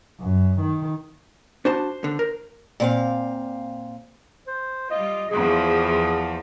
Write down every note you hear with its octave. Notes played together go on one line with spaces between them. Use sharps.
F#2
D#3
D4 F#4 C5 A5
D3
A#4
A#2 C4 F5
C5
G3 F4 D#5
E2 F3 G#4